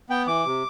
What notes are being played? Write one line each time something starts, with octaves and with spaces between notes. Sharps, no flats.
B3 G5
E3 D6
C3